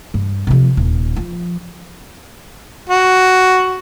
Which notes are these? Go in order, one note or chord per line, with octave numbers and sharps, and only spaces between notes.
G2
C3 F3
D#1
F3
F#4